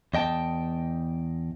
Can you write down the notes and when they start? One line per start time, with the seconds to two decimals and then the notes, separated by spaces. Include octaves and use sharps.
0.14 E2 D#5 G5 A5